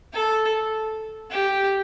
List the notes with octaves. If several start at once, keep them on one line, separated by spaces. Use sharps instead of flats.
A4
G4